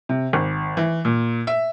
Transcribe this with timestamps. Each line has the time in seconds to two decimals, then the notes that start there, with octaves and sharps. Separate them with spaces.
0.09 C3
0.33 G#1
0.77 E3
1.05 A#2
1.47 E5